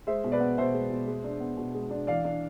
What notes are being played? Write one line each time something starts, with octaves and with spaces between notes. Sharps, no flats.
G#3 C5 E5
B2
B4 D5
B3
B2 C5 E5
G#3
B2
G#3
D4
B3
B2
G#3
D4
E3 D5 F5
D4